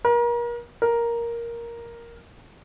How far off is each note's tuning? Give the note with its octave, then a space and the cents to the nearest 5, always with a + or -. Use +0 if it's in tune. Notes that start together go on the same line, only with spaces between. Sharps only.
A#4 +35
A#4 +5